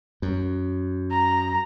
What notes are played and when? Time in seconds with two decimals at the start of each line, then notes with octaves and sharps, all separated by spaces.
0.22 F#2
1.11 A#5